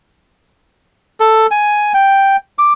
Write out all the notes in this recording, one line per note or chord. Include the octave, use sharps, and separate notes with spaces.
A4
G#5
G5
D6